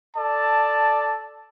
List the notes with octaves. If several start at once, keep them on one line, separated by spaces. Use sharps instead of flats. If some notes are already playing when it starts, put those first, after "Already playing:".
A4 D5 A5